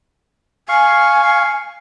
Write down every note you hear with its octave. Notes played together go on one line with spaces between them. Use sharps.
F5 G#5 C#6